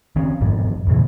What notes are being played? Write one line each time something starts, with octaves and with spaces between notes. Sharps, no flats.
D#3 C4 C#4
G1 F2 G#2 B2
F2 A#2 C#3 E3